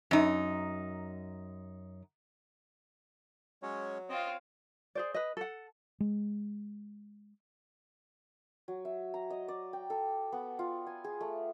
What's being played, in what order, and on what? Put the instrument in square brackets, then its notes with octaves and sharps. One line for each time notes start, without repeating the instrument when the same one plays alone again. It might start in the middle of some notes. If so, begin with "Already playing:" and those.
[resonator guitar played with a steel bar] F#2 D#4
[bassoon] F#3 [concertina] G#3 C#4 C#5
[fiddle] C4 F4 [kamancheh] C#5 F5 [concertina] D#5
[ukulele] G#4 C5 D5
B4 D#5
A4 F#5
[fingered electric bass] G#3
[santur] F#3
E5
A#5
D#5
D5
G5
A4
B3
F4
G#5
G#4
A3